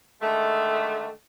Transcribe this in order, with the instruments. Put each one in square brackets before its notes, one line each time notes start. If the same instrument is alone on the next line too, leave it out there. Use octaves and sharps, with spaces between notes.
[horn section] D3 D#3 G#3 A3